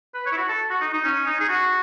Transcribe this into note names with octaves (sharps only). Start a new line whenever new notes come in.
B4
C#5
E4
F#4
A4
F#4
D#4
D#4
C#4
D#4
G#4
F#4